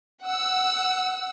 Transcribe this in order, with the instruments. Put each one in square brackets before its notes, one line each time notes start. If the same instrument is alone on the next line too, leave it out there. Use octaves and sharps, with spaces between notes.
[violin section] F#5 E6